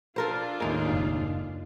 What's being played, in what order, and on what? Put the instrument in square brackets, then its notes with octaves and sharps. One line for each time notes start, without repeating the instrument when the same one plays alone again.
[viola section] D4 F4 [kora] A4 A#4 C5
[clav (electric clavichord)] D#2 A2 G#3 [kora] A#3 D#4
[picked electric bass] F#1